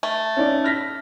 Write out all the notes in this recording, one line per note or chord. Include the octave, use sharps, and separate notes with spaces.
A3
C#4 D#4 D5
F6 A#6 B6